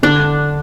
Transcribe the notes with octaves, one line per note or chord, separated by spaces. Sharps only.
D3 D4